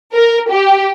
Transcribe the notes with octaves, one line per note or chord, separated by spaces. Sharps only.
A#4
G4